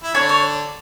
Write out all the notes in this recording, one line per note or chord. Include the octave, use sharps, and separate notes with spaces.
E4
D3 D4 C#5
C#5